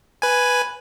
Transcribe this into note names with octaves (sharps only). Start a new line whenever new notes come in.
B4 G#5